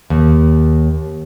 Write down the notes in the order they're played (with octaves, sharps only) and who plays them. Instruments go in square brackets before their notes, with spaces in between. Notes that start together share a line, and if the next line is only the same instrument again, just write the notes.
[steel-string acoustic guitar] D#2